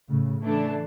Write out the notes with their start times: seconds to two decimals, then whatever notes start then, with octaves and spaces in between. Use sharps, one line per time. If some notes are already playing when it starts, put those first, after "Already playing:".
0.08 A2 C#3
0.43 E3 A3 D4